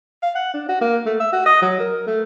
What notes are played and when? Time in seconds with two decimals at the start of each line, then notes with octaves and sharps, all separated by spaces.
0.22 F5
0.35 F#5
0.54 D4
0.69 F#4
0.81 A#3
1.06 A3
1.20 E5
1.32 F#4
1.46 D#5
1.62 F#3
1.80 A#4
2.07 A3